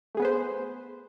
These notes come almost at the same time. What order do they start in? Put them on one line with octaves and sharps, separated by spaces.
A3 G#4 B3 B4 C5